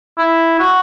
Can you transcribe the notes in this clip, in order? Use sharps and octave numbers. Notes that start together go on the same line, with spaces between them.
E4
F#4